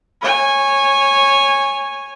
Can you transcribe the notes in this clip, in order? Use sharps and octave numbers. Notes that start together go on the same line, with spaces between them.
C#5 G#5